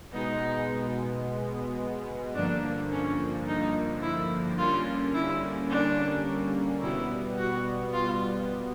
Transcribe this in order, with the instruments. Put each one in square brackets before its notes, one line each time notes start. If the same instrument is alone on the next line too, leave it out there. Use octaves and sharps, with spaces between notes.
[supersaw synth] B2 G#3 B3 [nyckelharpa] D#4
[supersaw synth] G2 D3 F3 A#3 [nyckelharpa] D4
[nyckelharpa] C#4
D#4
E4
[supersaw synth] D3 G3 A#3 C#4 [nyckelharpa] F4
[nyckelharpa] E4
D4
[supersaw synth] B2 G3 B3 [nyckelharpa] E4
[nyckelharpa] F#4
F4